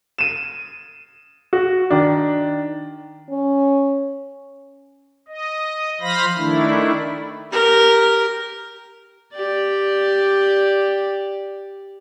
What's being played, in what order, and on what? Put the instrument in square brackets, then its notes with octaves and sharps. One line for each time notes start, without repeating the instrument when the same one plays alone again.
[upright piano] D#7 E7
F#4
D#3 D4
[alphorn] C#4
[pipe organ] D#5
F3 C5 F5 B5 A#6
D#3 A3 D4 E4
[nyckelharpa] G4 A#4
G4 D5